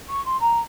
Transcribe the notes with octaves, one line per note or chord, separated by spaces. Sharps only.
C#6
C6
A#5